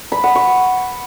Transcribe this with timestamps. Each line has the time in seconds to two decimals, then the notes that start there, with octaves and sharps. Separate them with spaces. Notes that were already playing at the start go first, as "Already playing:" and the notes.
0.12 B5
0.24 F#5
0.35 C#6